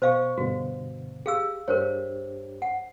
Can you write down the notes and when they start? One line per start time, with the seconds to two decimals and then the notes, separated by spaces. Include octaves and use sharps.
0.02 B2 C5 D#5 F5 C#6
0.38 G2 B2 D3 F#4
1.26 G4 G#4 F5 E6
1.68 G2 D4 G4 A#4 C5 C#5
2.62 F#5